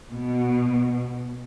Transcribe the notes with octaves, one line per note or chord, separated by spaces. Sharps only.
B2